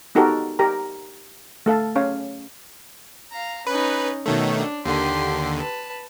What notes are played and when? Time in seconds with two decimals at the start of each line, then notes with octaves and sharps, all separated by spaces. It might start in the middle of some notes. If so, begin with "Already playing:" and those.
0.15 B3 D#4 F#4 G4 A4 A#4
0.59 G4 A#4 A#5
1.66 A3 A4 F5 A5
1.96 C#4 C#5 F5
3.31 F5 A#5
3.67 C#4 D#4 B4
4.26 B2 D#3 A3 C#5
4.55 D4
4.86 D#2 D3 G4 C6
5.59 B4 A5